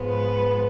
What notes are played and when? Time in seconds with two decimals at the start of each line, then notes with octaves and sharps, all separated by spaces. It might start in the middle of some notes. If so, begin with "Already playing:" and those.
Already playing: G#2 F3 G#3 B3
0.09 B4